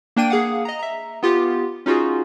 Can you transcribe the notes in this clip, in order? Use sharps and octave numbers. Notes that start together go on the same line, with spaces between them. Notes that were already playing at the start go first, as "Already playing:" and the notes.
A#3 D4 G5 D#7
A#3 G#4 F5 F#5
D#5 A#5
E5 A#5
B3 F4 G4
C#4 D#4 F4 F#4 G#4